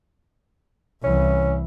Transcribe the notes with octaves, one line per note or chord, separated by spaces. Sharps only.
C2 E3 C#4